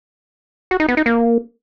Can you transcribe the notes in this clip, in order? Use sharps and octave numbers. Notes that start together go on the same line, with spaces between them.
F#4
D#4
B3
D#4
A#3